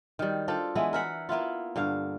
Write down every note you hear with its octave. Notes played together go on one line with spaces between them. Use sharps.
D#3 G3
D4 F4 A4 C5
E3 G#3 B3 E4
A#4 E5 F#5
A#3 B3 E4 F4
G2 D3 F5